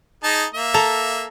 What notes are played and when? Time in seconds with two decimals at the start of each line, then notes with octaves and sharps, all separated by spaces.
0.24 D#4 G#4 A5
0.54 A#3 E5
0.74 A4 A#5